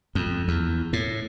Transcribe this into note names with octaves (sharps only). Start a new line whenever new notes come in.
F2
E2
A2